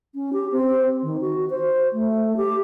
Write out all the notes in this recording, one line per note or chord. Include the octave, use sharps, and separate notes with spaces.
C#4
G4
C4
D#3
F#4
C5
A3
G4